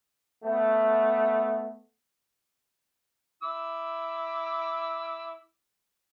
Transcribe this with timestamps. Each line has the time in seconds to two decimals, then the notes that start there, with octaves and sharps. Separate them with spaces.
0.44 A3 B3
3.43 E4 D6 E6